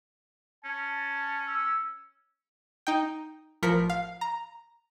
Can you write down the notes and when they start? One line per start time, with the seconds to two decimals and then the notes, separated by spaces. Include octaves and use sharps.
0.65 C#4 A5
1.48 E6
2.87 D#4 G5
3.63 A1 F3 A#4 B6 C#7
3.90 F5
4.21 A#5